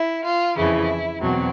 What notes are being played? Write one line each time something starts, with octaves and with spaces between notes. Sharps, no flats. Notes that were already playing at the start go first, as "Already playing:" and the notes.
Already playing: E4
F4
F2 C#3 E3 E4
E2 B2 F#3 C4